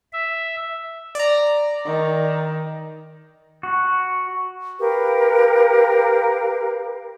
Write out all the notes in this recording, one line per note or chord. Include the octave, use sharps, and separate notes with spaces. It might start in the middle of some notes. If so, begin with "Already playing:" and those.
E5
D5 A#5
D#3
F#4
G4 A#4 B4 F5